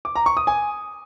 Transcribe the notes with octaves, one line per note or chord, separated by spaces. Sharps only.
D6
A#5
C#6
D#6
G#5